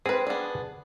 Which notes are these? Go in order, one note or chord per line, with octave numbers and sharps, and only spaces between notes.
C4 G#4 B4
B3 D4